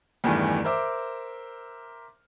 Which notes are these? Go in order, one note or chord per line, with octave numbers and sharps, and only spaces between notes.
E2 G2 D#3 E3 A3
A#4 C5 E5 D6